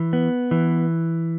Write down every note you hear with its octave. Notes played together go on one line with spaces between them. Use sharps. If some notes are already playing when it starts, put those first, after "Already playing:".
Already playing: E3
B3
E3